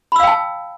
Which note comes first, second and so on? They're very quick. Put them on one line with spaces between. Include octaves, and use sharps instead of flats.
B5 E6 F5 G5 A5